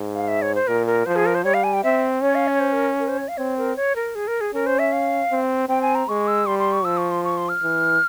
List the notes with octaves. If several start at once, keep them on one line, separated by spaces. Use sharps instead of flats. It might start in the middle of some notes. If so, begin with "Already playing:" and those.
Already playing: G#2
F5
E5
C#5
C5
A#2 A#4
A#4
F3 C5
G#4
A#4
C5
G3 C#5
F5
G#5
G5
C4 E5
C#4 C#5
F5
C#5
C5
A#4
A#4
C5
C#5
F5
C4 C#5
A#4
C#5
A#4
G#4
A#4
G#4
C#4 A#4
C5
E5
F5
C4
C4 G5
G#5
A#5
G#3 C#6
E6
G3 C6
C6
C#6
F3 E6
C#6
C6
C#6
C6
F6
E3